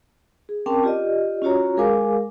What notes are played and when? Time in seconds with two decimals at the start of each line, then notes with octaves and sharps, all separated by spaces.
0.49 G#4
0.66 C4 C#4 A#4 G5 A5 D6
0.83 F4 G4 D5 D#5
1.42 C#4 F4 F#4 C#5 A#5
1.77 G#3 G#4 A#4 F5 G#5 D6